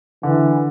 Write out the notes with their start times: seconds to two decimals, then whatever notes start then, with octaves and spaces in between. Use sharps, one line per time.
0.23 D3 E3